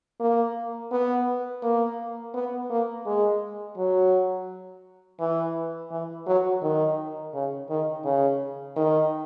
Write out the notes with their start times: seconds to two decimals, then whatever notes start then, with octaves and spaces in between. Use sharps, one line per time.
0.20 A#3
0.92 B3
1.63 A#3
2.34 B3
2.70 A#3
3.06 G#3
3.77 F#3
5.20 E3
5.91 E3
6.26 F#3
6.62 D#3
7.34 C#3
7.69 D#3
8.04 C#3
8.76 D#3